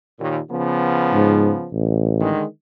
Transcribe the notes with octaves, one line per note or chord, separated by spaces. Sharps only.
D#2 A#2
C#3 F3 B3
G#2
A1
D3 D#3 G#3